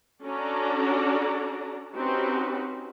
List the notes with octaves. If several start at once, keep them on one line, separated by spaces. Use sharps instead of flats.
C#4 D4 F#4 A4 D5 A#5
C4 C#4 D#4 F#4 G4 B4